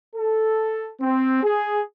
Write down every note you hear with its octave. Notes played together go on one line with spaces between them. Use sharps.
A4
C4
G#4